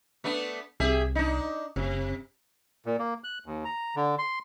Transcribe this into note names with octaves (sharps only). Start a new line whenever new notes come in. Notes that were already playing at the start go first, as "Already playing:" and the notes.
A3 B3 D4
C2 G4 G#4 E5
D4 D#4
F#1 C3
A#2
A#3
F#6
D#2
A#5
D3
C6